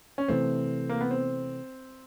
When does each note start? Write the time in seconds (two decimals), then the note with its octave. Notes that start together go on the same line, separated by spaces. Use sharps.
0.18 C#4
0.28 C3 E3 A3 C4
0.89 A#3
1.01 B3
1.11 C4